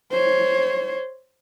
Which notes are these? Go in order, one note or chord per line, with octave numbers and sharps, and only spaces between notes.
C5 C#5